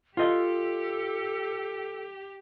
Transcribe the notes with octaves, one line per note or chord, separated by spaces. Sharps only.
F4 G4 A4 D#5